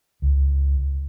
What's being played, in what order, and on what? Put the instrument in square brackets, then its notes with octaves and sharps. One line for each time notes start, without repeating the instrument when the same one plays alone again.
[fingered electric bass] C#2